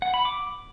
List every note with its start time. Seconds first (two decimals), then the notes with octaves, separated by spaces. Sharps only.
0.02 F#5
0.14 B5
0.25 D6